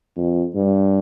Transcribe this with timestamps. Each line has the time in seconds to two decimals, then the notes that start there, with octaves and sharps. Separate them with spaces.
0.17 F2
0.55 G2